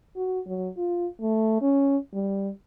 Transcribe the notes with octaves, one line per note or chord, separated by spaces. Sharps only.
F#4
F#3
F4
A3
C#4
G3